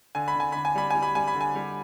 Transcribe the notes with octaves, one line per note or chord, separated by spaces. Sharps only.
D3 G#5
B5
D3 G#5
D3 B5
G#5
G3 B5
G3 G#5
B5
G3 G#5
B5
D3
G#5
G3